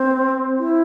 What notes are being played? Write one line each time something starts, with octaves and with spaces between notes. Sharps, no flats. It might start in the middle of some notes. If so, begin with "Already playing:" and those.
Already playing: C4
E4